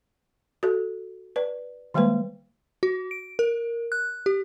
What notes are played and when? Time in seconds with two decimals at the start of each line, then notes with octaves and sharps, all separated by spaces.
0.63 F#4 A4
1.36 B4 D5
1.94 D#3 G3 G#3 A#3 B4
2.83 F#4
3.11 D7
3.39 A#4
3.92 F#6
4.26 G4